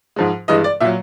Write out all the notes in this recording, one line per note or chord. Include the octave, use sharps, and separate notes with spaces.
G#2 F3 G#3
G2 E3 G#3 D#5
D5
A#2 F#3 E5